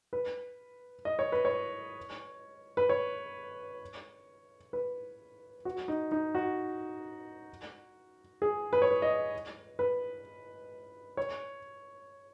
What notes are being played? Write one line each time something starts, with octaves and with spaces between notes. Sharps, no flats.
B4
D#5
C#5
B4
C#5
B4
C#5
B4
F#4
D#4
D#4
F#4
G#4
B4
C#5
B4
D#5
B4
C#5